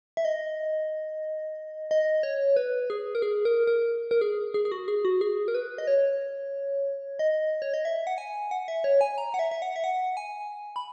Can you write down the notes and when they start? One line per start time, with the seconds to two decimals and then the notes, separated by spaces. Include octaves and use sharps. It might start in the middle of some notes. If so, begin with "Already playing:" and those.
0.17 E5
0.25 D#5
1.91 D#5
2.23 C#5
2.56 B4
2.90 G#4
3.15 A#4
3.22 G#4
3.45 A#4
3.67 A#4
4.11 A#4
4.21 G#4
4.54 G#4
4.65 G#4
4.72 F#4
4.88 G#4
5.05 F#4
5.21 G#4
5.48 A#4
5.55 B4
5.78 D#5
5.87 C#5
7.19 D#5
7.62 C#5
7.74 D#5
7.85 E5
8.07 F#5
8.18 G#5
8.51 F#5
8.68 E5
8.84 C#5
9.01 G#5
9.18 A#5
9.34 F#5
9.39 E5
9.51 E5
9.62 F#5
9.76 E5
9.84 F#5
10.17 G#5
10.76 B5